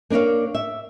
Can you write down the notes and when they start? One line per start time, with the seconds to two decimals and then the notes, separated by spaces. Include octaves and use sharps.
0.10 A#3 D4 A#4 C#5 F5
0.55 E5